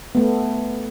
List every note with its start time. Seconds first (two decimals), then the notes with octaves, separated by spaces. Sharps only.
0.15 A3 B3